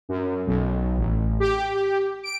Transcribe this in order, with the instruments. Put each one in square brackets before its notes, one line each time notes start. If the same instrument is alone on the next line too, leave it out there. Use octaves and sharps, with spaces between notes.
[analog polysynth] F#2
B1
A1
G4
D7